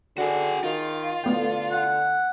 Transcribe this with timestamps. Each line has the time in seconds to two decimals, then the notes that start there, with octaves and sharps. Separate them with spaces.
0.18 D3 F#4 G#4
0.64 D#3 F4
1.24 D3 A3 B3 G5
1.72 F#5